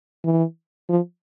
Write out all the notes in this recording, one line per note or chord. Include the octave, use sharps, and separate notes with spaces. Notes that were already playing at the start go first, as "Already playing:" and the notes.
E3
F3